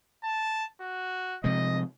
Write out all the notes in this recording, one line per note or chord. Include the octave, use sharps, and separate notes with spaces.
A5
F#4
C3 F3 G#3 D#5